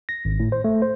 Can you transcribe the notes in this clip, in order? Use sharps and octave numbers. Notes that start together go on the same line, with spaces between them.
A#6
G#1
A2
C5
A3
C5